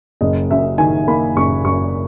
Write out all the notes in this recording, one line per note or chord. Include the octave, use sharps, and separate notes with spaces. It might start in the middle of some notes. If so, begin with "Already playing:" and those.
F#1 D#5
F#2 E5
D#3 G#5
A#3 B5
F#1 C#6
F#2 C#6